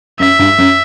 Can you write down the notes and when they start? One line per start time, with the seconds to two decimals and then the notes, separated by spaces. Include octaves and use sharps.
0.20 F#2 E5
0.39 G2
0.58 F#2